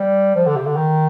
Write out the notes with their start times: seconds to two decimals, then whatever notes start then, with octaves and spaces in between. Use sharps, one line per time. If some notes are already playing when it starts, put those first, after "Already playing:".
Already playing: G3
0.35 F3
0.46 D3
0.56 C3
0.66 D3
0.76 D#3